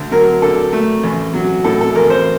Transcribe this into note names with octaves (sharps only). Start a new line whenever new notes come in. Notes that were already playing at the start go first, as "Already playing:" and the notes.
Already playing: D2
F#3 A#4
D3 A4
A3
A1
F#3
A2 A4
A4
A1 A#4
C5